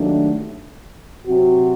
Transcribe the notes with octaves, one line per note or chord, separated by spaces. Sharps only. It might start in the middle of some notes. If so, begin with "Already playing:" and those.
Already playing: D#2 D#3 F#3 A3 D4
C3 F#3 C4 F#4